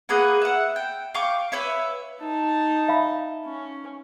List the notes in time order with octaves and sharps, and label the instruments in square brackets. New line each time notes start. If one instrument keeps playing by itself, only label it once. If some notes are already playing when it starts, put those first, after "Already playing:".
[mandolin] A#3 G#4 B4 F#5
E5 F#5
G5
F5 G5 C#6 D6
B4 C#5 E5
[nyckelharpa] D#4 A5
[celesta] E5 F5 B5
[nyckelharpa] C#4